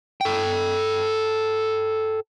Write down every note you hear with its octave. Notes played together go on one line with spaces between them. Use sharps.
A4 G5